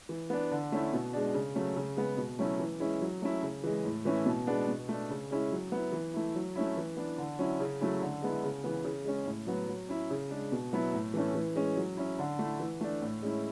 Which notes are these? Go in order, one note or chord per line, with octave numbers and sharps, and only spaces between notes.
E3
B3 D4
D3
A3 C#4 E4
B2
G#3 D4
C#3
F#3 A3 C#4
C#3
G#3 B3
B2
F#3 A3 C#4 E4
E3
G#3 C#4 E4
F#3
A3 C#4 E4
C#3
E3 G#3
A2
E3 A3 C#4 E4
B2
G#3 B3 D4
B2
A3 D4
C#3
G#3 C#4 E4
F#3
B3 E4
E3
A3 E4
F#3
A3 C#4 E4
E3
B3 D4
D3
F#3 C#4 E4
C#3
F#3 A3 C#4 E4
D3
G#3 B3 E4
C#3
E3 B3
C#3
G#3 C#4
A2
F#3 B3
F#3
C#4 E4
C#3
G#3 D4
B2
F#3 B3 E4
A2
E3 A3 C#4
E3
G#3 C#4
F#3
C#4 E4
D3
A3 E4
E3
A3 D4
A2
G#3 C#4 E4